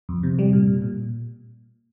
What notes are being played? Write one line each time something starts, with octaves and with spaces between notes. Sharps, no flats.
F2
C3
G3
A#2
A#2
A#2